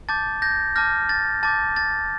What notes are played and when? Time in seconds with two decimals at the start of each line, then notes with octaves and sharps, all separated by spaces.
0.09 A5 D6 G6 A6
0.42 G6 A#6
0.76 A5 D6 F6 G6 A#6
1.09 A6
1.43 A5 D6 G6 A6
1.76 A6